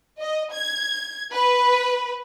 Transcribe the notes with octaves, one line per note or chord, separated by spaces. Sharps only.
D#5
G#6
B4